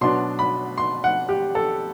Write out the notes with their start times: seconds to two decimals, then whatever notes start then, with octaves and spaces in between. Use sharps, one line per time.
0.01 B2 F#3 B3 D4 C6
0.39 B5
0.78 C6
1.04 F#5
1.29 G4
1.55 A4